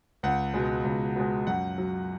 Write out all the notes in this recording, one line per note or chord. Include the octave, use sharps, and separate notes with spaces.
C#2 F#5
B2 G#3
C#2
B2 G#3
F#2 F#5
F#3